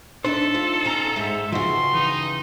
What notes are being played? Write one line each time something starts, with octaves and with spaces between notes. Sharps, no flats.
D4 D#4 A4 C5 E5 A5
F4
D2 C#4 A#5
G#2 G#3 E5
G2 C#3 F3 D#4 F#4 C6
E3 D#4